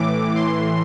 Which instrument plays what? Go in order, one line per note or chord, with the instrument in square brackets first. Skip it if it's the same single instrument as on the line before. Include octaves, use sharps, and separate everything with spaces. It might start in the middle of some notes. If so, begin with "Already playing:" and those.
Already playing: [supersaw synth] A2 E3 D6
C6